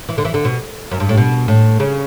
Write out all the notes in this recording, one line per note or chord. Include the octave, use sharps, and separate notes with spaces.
E3
D3
E3
D3
B2
F#2
G2
A2
B2
A2
C#3